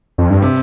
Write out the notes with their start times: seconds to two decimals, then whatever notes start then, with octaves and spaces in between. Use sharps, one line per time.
0.18 F2
0.30 G2
0.42 C3